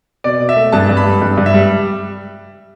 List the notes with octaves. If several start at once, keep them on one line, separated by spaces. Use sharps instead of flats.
B2 D5
B2
E5
A3
G2 A5
G2
B5
G3
G2
G2
E5
G3